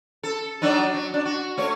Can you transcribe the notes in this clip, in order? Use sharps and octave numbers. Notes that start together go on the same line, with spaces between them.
A4
F#3 D4 D#4
F#3
D4
F#4
A3 C#5